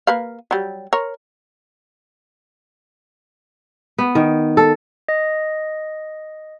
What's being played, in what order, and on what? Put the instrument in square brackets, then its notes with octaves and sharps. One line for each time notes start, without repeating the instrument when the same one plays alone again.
[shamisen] A#3 B4 F5
F#3 G3
A#4 C#5
[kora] B3
D#3
A4
[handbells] D#5